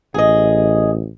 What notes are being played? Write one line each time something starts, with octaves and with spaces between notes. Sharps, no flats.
A1 G#4 D#5